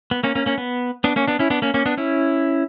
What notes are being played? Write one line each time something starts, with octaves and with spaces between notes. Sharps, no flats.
B3
A#3 C#4
A#3 C#4
A#3 C#4
B3
B3 D4
A#3 C#4
B3 D4
C#4 E4
B3 D4
A#3 C#4
A#3 C#4
B3 D4
C#4 E4